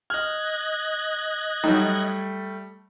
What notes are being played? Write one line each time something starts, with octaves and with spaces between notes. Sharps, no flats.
D#5 F6 F#6 G#6
F#3 G3 A3 D#4